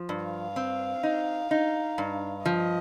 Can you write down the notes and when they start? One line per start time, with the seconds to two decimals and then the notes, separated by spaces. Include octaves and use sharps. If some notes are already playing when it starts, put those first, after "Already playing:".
Already playing: F3
0.09 G2
0.25 F5
0.56 C4
1.03 D#4
1.51 D#4
1.98 G2
2.46 F3 D#5